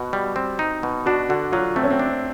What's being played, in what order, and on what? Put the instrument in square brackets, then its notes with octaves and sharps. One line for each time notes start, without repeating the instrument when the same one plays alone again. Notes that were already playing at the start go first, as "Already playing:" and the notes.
Already playing: [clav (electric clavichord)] B2 [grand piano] F#4
[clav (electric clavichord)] G3
C4
D#4
B2
[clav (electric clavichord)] D4 [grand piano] F#4
[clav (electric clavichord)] D3 [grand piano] F#4
[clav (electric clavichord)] F#3 [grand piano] F4
[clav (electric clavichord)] A3 [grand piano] C4
[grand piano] C#4
C4
[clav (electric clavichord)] D4